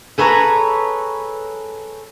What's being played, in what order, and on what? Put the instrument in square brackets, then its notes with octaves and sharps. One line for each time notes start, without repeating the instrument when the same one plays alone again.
[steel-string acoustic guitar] G#4 A4 B4 C#5 F5 A#5